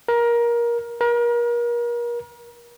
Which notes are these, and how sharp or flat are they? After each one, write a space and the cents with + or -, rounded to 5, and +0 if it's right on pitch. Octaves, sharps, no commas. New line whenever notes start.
A#4 +20
A#4 +35